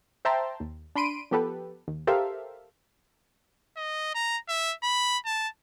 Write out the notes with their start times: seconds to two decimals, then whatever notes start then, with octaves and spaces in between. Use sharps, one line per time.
0.25 C5 E5 G5 A5 A#5 C6
0.60 D#2
0.95 D4 B5 C6 D7 D#7
1.31 F3 B3 G4 A4 B4
1.88 D#2
2.07 G4 A4 A#4 C5 E5 F5
3.77 D#5
4.15 A#5
4.49 E5
4.83 B5
5.26 A5